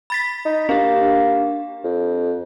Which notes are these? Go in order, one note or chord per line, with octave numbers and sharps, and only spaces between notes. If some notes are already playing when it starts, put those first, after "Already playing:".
B5 A6 B6
D#4
A#3 D4 G4
F2